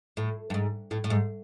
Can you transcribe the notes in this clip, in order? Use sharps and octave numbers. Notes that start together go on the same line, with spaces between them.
A2
G2
G#2
A2
A2
G#2